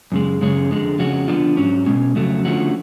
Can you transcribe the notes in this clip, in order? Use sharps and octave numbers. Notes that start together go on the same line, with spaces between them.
F#2 C#3 G#3
F#2 C#3 G#3 C#4
F2 D3 G#3
F2 C#3 G#3 C#4 F#4
D3 F3 B3 D4 F4
G#2 F#3 C#4
B2 G#3 C#4
F2 C#3 F#3 A3
D3 F3 A3 C#4 F#4